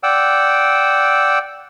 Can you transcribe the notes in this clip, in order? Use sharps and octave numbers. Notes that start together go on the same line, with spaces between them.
D5 F#5 G5 E6